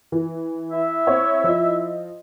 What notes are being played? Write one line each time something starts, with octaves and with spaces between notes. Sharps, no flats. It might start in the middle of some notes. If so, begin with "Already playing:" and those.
E3
E4 E5
C4 C#5
F3 D#5